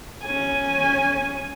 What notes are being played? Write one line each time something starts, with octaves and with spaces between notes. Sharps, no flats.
C#4 G#5